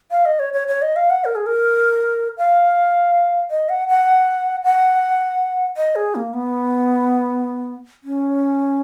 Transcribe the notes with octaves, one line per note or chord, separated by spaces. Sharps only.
F5
D#5
C#5
C#5
C#5
D#5
F5
F#5
A#4
G#4
A#4
F5
D#5
F#5
F#5
F#5
D#5
G#4
A#3
B3
C#4